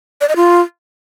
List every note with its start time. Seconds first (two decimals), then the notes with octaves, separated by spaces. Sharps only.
0.21 D5
0.29 D#5
0.36 F4